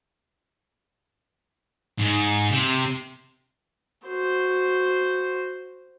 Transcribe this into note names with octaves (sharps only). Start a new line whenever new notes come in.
G#2
C3
F#4 C5